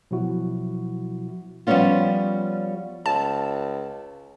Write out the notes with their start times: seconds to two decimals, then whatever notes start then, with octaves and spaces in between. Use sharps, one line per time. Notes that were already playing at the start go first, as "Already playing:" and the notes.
0.11 B2 F3 F#3 E4 F#4
1.67 F3 G3 A#3 B3 C#4 F4
3.06 C#2 A5